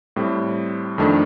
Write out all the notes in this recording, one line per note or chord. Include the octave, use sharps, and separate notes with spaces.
A2 G3 C4
F2 D#3 A3 D4